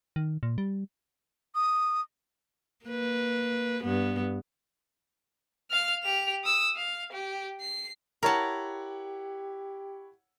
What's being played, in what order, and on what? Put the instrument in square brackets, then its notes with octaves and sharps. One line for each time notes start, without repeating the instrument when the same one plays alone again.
[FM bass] D#3
A#2
G3
[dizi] D#6
[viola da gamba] A#3 B4
G2 B3
[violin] F5 F6
G4 F7
D#6 E6
F5
G4
C7
[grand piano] E4 C#5 F#5 [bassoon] G4 [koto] A#4 A5